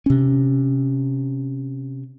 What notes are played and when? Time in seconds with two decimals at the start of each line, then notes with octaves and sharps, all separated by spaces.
0.06 C3 C#4